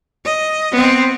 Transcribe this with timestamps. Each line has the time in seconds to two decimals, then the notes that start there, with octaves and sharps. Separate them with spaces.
0.25 D#5
0.72 B3 C4